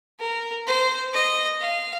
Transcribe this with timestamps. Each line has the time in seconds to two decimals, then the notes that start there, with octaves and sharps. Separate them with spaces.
0.20 A#4
0.67 C5
1.13 D#5
1.61 F5